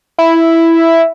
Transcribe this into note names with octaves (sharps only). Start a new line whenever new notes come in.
E4